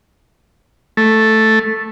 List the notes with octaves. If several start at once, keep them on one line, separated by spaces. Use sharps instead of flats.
A3